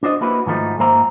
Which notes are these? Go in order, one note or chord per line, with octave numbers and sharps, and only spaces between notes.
D4 F#4 C5 D#5
A#3 E4 F#4 B4
G#2 D#3 F3 A3 D#4
G#2 A#3 C5 E5 A#5